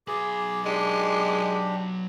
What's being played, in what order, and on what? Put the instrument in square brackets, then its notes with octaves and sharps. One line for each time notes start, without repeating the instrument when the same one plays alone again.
[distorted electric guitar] F#3 B4 [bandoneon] G#4 [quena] D6
[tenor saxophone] G#3 [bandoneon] D4 G4